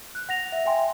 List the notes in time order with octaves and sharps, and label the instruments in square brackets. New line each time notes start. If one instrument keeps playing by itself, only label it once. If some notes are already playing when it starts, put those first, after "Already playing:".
[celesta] F#6
F#5 A#6 F7
E5
E5 G5 G#5 C6